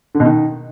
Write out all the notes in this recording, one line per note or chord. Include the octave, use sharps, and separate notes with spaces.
D3
B2
D#3